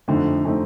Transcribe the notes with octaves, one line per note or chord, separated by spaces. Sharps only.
F2 D3 A3 C4 D#4
D3 A3 C4 D#4